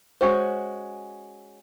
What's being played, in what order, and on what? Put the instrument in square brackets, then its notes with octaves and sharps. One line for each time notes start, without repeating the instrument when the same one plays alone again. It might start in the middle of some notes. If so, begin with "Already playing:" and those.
[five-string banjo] G#3 C#4 F#4 C5